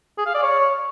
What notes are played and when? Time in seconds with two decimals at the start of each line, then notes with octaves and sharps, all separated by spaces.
0.18 G#4
0.26 F5
0.34 D5
0.43 C#5